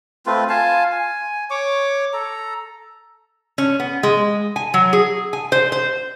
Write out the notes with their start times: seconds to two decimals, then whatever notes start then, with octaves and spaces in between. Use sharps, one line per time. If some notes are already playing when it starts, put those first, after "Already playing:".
0.26 A3 C4 F4 B4
0.49 F4 F5 G#5 A5
0.92 G#5
1.50 C#5 C#6 D6
2.13 A4 A#5
3.58 C#4
3.80 B3
4.03 G#3
4.56 G#5
4.74 F#3
4.93 G#4
5.33 G#5
5.52 C5
5.72 C5